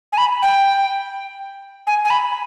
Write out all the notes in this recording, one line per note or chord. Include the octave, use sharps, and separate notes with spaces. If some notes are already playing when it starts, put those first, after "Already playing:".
G#5
B5
G5
G#5
G#5
B5